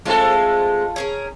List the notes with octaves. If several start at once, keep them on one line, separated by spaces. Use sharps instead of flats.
G#3 A3 C4 F4 A4
C#4 G#4 A#4